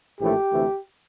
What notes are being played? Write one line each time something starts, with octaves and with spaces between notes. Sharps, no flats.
A#1 A2 E3 A3 G4
D2 C3 E3 A3